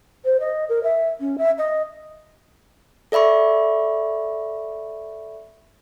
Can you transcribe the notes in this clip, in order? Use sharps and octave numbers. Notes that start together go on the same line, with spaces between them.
C5
D#5
A#4
E5
C#4
E5
D#5
A4 D5 E5 B5 C#6